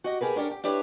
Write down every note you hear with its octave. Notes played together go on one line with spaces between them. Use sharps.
F#4 G4 D#5
G4 G#4 A#4 B4
C#4 D4 G4 A4 A#4
G4
D4 E4 G4 B4 C#5